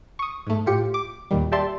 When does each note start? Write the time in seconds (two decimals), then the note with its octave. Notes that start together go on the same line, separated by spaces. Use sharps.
0.19 C#6 D#6
0.47 G#2 A3
0.66 A2 F4 G4 C#7
0.94 D6
1.31 D#2 A#2 D#3 G3
1.52 G4 D5 E5 A5 C6